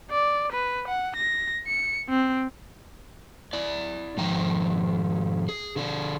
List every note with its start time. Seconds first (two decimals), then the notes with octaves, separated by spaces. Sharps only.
0.11 D5
0.53 B4
0.88 F#5
1.17 A#6
1.67 C#7
2.09 C4
3.53 E4 D5
4.17 G#2 D#3 F3 G5 A#5
5.49 G#4
5.76 D3 D4 G#4